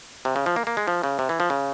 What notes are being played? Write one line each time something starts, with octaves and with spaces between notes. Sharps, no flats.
C3
C#3
F3
A#3
A#3
G#3
F3
C#3
C3
E3
F3
C#3